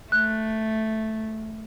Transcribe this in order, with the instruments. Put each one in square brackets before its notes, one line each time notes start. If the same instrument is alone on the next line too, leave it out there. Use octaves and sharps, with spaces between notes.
[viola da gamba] A3 [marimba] F#6